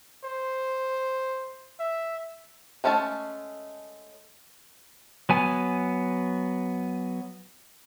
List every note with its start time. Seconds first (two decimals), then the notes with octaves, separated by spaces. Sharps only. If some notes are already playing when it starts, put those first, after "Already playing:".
0.24 C5
1.79 E5
2.84 G#3 A3 C#4 G#4 A5
5.29 F#3 B3 G#5